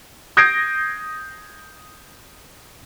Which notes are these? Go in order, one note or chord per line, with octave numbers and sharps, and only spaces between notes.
D#6 G6 G#6 A#6 C7 D7